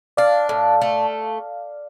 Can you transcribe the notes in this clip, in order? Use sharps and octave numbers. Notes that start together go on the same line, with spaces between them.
D4 D5 F5
A2
A3